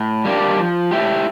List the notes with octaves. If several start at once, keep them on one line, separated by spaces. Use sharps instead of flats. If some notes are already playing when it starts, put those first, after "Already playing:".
Already playing: A2
G3 A#3 D4 G4
F3
A3 E4 G4